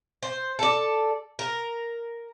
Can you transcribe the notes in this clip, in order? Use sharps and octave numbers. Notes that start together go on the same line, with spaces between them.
C5
A4 D5
A#4